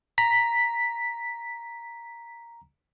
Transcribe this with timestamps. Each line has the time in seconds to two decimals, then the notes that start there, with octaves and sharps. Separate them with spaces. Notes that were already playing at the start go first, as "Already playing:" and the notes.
0.18 A#5 B6